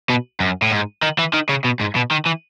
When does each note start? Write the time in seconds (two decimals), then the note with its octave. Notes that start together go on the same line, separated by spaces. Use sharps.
0.10 B2
0.40 F#2
0.62 A2
0.71 G#2
1.03 D#3
1.19 E3
1.34 D#3
1.50 C#3
1.65 B2
1.81 G#2
1.96 B2
2.11 D#3
2.26 E3